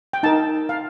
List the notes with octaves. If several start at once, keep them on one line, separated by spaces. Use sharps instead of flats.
G5
D#4 A#4 A5
F5